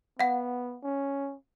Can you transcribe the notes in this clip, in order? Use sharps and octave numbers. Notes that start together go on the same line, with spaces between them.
B3 F5 F#5
C#4